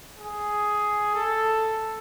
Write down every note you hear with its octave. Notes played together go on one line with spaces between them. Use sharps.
G#4
A4